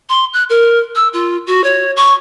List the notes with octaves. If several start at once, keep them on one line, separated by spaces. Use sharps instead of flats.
C6
F#6
A#4
E6
F4
F#4
C#5
C#6